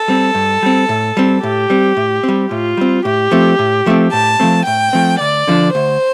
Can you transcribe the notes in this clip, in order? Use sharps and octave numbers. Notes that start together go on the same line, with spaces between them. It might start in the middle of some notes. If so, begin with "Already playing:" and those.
Already playing: A4
G3 C4
G2
G3 C4
A2
G3 C4
A2 G4
G3 C4
A2
G3 C4
A2 F4
G3 C4
A2 G4
F3 A3 C4
A2
F3 A3 C4
A2 A5
F3 A3 C4
A2 G5
F3 A3 C4
D2 D5
D3 F3 D4
D2 C5